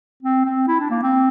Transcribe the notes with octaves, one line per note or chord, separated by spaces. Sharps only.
C4
C4
E4
D4
A#3
C4